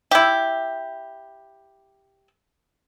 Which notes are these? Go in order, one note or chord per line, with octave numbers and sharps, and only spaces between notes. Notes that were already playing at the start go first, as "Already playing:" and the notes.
E4 G4